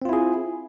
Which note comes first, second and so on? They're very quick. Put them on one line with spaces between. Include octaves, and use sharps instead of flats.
C4 F4 E4 G#4